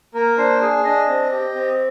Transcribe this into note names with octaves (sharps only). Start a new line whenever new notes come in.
A#3 A#4
D4 C5
G#4
D4 D#5
C4
G4
C4